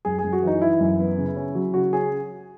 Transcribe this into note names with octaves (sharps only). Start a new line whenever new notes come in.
F#2 G#4
G#4
F#2
F#4
E3 D#4
E3 E4
F#2
B3
C#3
C#4
F#3
C#3 F#4
C#4 G#4